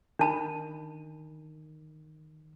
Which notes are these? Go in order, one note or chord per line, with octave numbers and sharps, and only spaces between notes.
D#3 D4 A5 B5